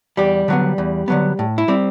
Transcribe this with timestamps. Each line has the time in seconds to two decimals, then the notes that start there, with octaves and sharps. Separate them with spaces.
0.17 E2 G3 G4
0.48 D3 F#3 B3
0.78 E2
1.08 D3 F#3 B3
1.39 A2
1.58 E4
1.68 G3 C4